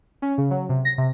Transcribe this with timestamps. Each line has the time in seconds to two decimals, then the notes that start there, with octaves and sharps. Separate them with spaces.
0.22 C#4
0.38 C#3
0.51 F#3
0.69 C3
0.85 A#6
0.98 C3